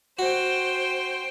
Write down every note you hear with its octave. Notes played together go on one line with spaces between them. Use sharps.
F#4 C5 G5